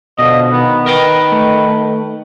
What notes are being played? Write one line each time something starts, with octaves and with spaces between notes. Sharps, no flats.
B2 D3 F3 D#5
D#3 B3
A#4 B4 D#5 G5
A3